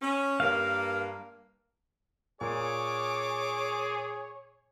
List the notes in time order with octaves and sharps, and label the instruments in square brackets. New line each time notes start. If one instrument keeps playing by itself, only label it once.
[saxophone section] C#4
[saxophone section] G2 A#3 [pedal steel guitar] F5
[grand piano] A#2 [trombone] G#4 [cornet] C#5 [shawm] D6